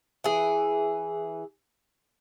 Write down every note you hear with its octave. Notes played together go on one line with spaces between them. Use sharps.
E3 G#4